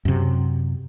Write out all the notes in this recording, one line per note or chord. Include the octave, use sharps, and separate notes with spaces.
F#2 C3